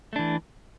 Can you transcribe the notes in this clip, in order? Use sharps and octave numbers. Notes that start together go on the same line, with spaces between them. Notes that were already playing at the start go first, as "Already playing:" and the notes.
E3 A3 D4